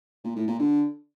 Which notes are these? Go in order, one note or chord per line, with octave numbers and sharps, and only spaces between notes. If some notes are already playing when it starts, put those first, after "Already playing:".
A#2
A2
A#2
D3